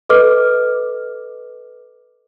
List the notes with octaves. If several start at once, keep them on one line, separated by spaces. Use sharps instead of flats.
A4 B4 D#5 D6 F6